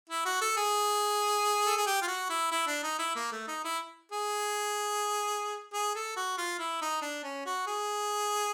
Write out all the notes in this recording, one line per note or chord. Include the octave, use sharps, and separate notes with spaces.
E4
F#4
A4
G#4
A4
G#4
G4
F4
F#4
E4
E4
D4
D#4
E4
A#3
A3
D#4
E4
G#4
G#4
A4
F#4
F4
E4
D#4
D4
C#4
F#4
G#4